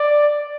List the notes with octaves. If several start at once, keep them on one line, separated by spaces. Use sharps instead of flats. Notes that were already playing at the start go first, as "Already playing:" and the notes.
Already playing: D5